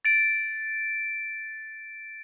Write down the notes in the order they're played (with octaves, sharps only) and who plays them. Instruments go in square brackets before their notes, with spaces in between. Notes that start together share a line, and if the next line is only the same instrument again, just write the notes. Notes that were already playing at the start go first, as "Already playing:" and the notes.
[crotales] A6 D7